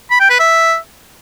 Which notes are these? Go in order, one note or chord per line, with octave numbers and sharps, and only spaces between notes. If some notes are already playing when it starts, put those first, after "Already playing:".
B5
G5
B4
E5